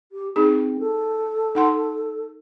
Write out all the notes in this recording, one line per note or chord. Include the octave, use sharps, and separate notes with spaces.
G4
C4 D#4 G#4
A4
D#4 F#5 C6